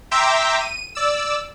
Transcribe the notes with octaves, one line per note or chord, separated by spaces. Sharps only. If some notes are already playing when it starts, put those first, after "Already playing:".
E5 G5 A#5 C6 D6 E6
D#7
D5 E6